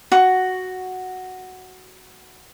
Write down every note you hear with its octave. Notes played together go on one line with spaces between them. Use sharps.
F#4 C#6